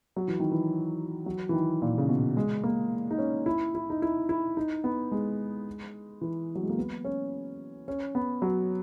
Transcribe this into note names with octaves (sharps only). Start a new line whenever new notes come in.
F#3
E3
D#3
E3
F#3
E3
D#3
A#2
C#3
B2
G#3
A#3
D#4
C#4
E4
E4
D#4
E4
E4
D#4
B3
G#3
E3
F#3
G#3
A#3
B3
C#4
C#4
B3
F#3